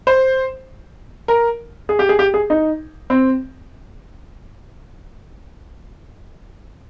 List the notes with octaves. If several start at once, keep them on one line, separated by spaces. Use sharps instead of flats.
C5
A#4
G#4
G4
G#4
G4
G#4
D#4
C4